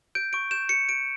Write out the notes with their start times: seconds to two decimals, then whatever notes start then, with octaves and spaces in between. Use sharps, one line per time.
0.15 G6 D7
0.33 C#6 D7
0.51 G6 E7
0.69 G6 C#7
0.88 G6 D7